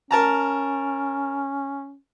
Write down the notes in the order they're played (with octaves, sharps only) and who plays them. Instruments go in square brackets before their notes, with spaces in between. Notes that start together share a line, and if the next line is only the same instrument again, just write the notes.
[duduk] C#4 [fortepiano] A#4 A5 A#5